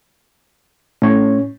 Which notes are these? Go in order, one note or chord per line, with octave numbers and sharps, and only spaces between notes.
A2 C#4 C#5